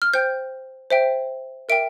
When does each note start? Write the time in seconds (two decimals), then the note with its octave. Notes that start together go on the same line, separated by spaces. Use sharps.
0.02 F6
0.14 C5 G5 G6
0.91 C5 E5 G5
1.69 A#4 E5 G5 D7